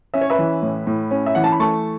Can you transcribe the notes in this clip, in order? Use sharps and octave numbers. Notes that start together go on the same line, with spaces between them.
C#4 E5
C#5
B4 E5
E3
A2
A2
C#4
E5
E3 F#5
A5
B5
A3 A5 C#6